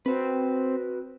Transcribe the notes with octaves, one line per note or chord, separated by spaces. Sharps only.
C4 F#4 B4